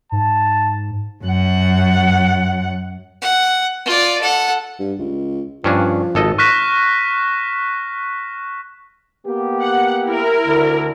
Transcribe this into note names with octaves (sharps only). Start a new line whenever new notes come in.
G#2 A5
F#2 F#5
F#5
F4 D5
A4 F#5
G2
C#2
G2 F3 C#4 D4
G#1 A4 D#5
C#6 F6 F#6 A#6 B6 E7
A#3 B3 G4
F#5
E4 A#4
D2 D3